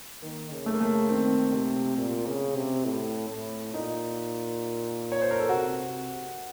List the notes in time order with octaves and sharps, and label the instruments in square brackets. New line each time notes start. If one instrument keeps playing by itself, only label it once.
[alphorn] D#3 [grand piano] A#3
[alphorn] C#3
[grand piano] A3
A#3
[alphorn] C#3 [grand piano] A3
[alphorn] D#3 [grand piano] C4
[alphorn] C3
A#2
C#3
C3
A2
A2
[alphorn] A#2 [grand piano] D#4
[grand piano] C#5
C5
A#4
A4
[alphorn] C3 [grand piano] F#4
[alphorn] C3